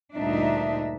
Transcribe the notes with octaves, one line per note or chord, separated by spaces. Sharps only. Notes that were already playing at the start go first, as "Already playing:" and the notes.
D2 G2 A#2 D4 D#4 E5